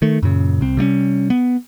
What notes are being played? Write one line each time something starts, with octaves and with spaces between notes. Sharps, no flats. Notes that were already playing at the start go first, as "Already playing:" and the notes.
D#3 A3
F#2 A#2 C#3
C2 C4
C3 G3 A#3 C#4
B3